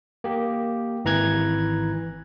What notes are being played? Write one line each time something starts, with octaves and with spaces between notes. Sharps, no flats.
A#3 G4
G#1 E3 A#5 F#6 G#6